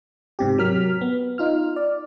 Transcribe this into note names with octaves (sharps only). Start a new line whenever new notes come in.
G#2 C3 G4
F#3 A#4 F6 B6
B3
D#4 F4 F6
D5